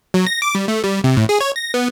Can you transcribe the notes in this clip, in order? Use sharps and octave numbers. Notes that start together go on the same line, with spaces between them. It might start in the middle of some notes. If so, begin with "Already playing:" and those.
F#3
A#6
D6
G3
A3
G3
C3
A2
G#4
C#5
A#6
B3